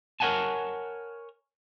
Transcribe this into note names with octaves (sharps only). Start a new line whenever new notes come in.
A#4 C#5 D#5 F#5 G#5 A5